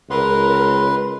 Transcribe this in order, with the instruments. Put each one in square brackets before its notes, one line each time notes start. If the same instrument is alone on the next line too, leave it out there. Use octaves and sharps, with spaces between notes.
[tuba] C#2 [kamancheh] A#4 [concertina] B4 C6